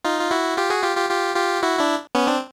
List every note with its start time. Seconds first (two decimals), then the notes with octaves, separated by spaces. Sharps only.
0.05 D#4 F4
0.20 F4
0.31 E4 F#4
0.58 F4 G4
0.70 F#4 G#4
0.83 F4 G4
0.97 F4 G4
1.09 F4 G4
1.35 F4 G4
1.63 E4 F#4
1.79 D4 E4
2.15 B3 C#4
2.27 C4 D4